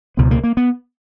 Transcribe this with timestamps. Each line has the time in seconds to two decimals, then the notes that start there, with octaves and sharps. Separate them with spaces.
0.17 C#2 B2 B3
0.31 A#3
0.44 A#3
0.57 B3